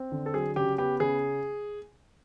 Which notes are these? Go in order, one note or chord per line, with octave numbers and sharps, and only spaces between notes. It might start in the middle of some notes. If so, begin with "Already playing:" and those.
Already playing: C4
D3
A4
F#3 G#4
C#3 G4
B3 G4
C#3 G#4